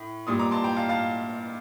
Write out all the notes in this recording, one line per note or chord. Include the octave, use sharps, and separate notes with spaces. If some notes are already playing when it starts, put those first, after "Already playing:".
Already playing: A2
A#2 G3 C6 D#6
A#5 D6
A5 C6
G5 A#5
F5 A5
F5 A5